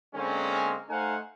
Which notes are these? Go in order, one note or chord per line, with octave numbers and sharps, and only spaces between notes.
D3 G#3 A#3 C4 C#4
A3 D#4 C5 F5 F#5 G#5